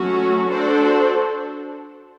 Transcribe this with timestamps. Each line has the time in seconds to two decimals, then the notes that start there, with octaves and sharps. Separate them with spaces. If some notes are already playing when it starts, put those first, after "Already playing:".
Already playing: F#3 A3 C#4 F#4
0.49 D4 F#4 A4 C5